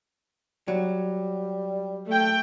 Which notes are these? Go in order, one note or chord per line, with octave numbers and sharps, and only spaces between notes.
F#3 G3
A3 G5